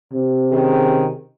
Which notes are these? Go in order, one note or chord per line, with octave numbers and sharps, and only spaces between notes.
C3
D#3 C#4 G#4